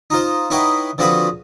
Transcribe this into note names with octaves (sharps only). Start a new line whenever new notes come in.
D#4 F4 C5
D#4 E4 B4 C#5 F#5 G5
D3 F3 C4 F#4 G#4 B4